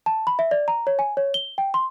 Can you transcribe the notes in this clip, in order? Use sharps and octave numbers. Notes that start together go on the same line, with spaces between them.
A5
B5
E5
D5
A#5
C#5
G#5
C#5
G7
G5
C6